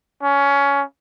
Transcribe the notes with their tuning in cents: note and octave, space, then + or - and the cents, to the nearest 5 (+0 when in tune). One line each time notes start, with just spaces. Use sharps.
C#4 +20